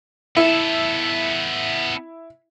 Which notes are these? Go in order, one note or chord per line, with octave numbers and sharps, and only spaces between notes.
B3 E4 A4